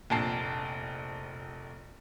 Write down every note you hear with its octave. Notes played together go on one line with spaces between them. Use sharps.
F1 A#1 A5 C7